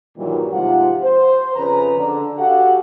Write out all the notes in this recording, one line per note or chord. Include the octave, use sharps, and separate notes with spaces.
G2 A#2 D#3 E3 F#3 G3
G#2 C3 F3 F4 G4 F#5
C5
F2 C#3 B4 A#5
D3
F#4 G4 A4 F5 F#5